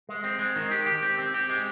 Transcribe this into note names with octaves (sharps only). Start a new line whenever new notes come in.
G#3
C4
G#3
D#3
G4
G4
C4
C4
G4
G#3